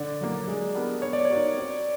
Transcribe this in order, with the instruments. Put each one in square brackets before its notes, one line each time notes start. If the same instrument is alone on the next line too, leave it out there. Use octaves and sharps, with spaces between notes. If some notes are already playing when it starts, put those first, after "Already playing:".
Already playing: [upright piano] D3 [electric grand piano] D5
[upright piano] F#3 A#3
G#3
B3 D4 G4 A#4
[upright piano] B3 [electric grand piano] C#5
[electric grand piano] D5
C#5
[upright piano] D#4 F#4 A#4
C4